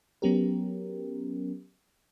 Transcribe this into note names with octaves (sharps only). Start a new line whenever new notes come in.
F#3 B3 C#4 G4 A#4